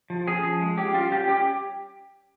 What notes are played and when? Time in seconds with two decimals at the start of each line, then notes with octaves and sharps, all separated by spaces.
0.10 F3
0.27 C#4 G#4
0.44 F3
0.61 G#3
0.78 C#4 G4
0.94 G3 F4
1.12 C#4 G4
1.28 C#4 G4